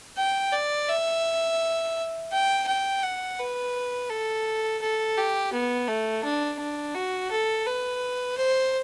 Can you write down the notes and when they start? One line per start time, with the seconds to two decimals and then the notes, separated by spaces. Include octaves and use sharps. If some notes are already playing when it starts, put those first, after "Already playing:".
0.18 G5
0.53 D5
0.89 E5
2.32 G5
2.68 G5
3.03 F#5
3.39 B4
4.10 A4
4.82 A4
5.17 G4
5.53 B3
5.88 A3
6.24 D4
6.59 D4
6.95 F#4
7.31 A4
7.67 B4
8.38 C5